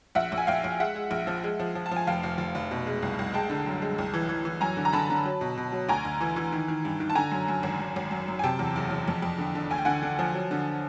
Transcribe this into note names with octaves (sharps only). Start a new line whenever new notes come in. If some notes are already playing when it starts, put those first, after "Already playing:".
A#1 E5 F#5
A#1
G#5
A#1 F5 G5
A#1
G#3 E5 F#5
G#3
A#1
F3
G#3
F3
F3
A5
F3
G#5
F1 F5 G5
F1
F1
F1
B2
G#3
C2
C2
G#3 G5 A5
D3
F#2
G#3
C2
E3
E3
E3
F#2 G#5 A#5
D3
A#5
D3 A5 B5
D3
F#3
B2
B2
F#3
D2 G#5 A#5
D2
E3
E3
D#3
D#3
G2
D#3
A5
D3 G#5 A#5
F#2
F#2
G#1
F#2
G#1
F#2
F#2
G#5
C3 G5 A5
E2
F#1
E2
F2
F2
D3
D3
D2 G#5
G5
D3 F#5 G#5
D3
F3
F#3
D3